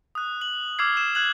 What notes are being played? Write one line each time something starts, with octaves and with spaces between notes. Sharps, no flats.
D#6 F#6
F#7
D6 E6 F6 G#6 C7
E7
F#6 G#6 F#7